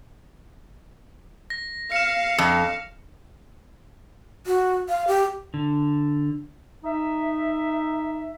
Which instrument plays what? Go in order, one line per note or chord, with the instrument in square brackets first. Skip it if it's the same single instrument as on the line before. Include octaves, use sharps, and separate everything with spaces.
[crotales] A#6
[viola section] F5 [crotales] C#7 E7
[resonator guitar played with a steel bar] F2
[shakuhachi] F#4
F5
G4
[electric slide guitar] D3
[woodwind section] D#4 E5